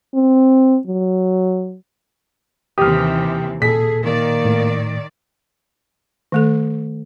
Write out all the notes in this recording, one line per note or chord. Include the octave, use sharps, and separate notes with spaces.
C4
F#3
D#2 C3 E3 G4 D#6 F6
A#2 G#4 A4 B6
D#3 A#3 D5
A2
D#3 A3 A4